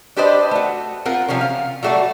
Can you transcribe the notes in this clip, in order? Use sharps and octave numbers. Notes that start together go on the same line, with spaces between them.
D4 G4 B4 C5 D5 D#5
A3 F#4
C4 F4 A#4 F#5
C3 F3 G3 C#4
F5
F#3 G3 A3 F#4 D5